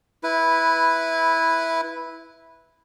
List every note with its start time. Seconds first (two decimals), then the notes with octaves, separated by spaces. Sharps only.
0.23 E4 B4